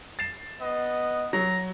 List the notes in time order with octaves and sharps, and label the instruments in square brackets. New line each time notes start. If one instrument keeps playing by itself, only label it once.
[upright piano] A6 C7 E7
[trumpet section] B3 D#5
[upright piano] F#3 [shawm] A#5